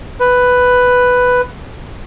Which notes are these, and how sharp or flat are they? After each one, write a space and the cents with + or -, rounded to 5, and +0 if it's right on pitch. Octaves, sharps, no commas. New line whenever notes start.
B4 +5